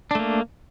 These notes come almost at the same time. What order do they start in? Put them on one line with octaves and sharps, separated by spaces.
D4 A3 A#3